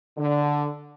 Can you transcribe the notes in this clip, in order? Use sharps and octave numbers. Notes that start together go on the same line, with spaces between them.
D3